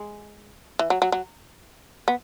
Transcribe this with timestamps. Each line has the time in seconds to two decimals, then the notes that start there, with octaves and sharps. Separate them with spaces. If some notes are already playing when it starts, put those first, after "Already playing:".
Already playing: G#3
0.79 E3
0.90 F#3
1.02 F#3
1.12 F#3
2.08 B3